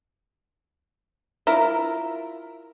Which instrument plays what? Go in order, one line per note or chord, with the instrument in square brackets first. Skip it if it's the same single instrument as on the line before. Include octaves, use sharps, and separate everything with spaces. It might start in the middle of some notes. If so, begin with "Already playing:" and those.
[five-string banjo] E4 F4 A#4 E5